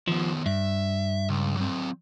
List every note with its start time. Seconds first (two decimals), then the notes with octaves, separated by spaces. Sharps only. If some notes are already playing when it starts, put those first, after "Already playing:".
0.08 D#3 F3 B3
0.46 G2 E5
1.29 C#2
1.57 F#3 C4